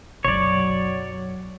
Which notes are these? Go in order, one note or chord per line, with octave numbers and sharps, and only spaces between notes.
F1 B1 F#2 F#3 C#5 D5